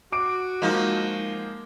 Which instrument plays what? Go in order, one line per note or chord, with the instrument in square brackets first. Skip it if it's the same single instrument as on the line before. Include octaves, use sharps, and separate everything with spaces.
[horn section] F#4 [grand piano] D6 D7
[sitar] F3 D#4 [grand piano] G#3 A#3